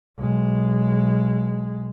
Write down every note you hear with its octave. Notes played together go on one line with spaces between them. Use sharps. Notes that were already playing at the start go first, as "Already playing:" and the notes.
B1 G#3